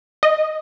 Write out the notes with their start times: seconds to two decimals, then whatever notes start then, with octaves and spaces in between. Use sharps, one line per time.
0.23 D#5